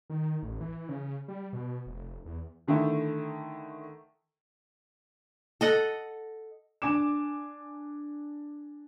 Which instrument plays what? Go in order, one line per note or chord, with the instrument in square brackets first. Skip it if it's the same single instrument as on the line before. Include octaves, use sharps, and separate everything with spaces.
[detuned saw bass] D#3
A1
E3
C#3
G3
B2
F1
E2
[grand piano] D3 D#3 A3 E4
[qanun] A4 D#5 F#5
[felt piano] D4 G#5 D6 E7